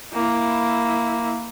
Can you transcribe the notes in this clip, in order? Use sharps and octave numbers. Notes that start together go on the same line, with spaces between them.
A#3 E4